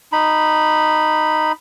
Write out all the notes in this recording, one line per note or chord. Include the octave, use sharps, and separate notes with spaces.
D#4 B5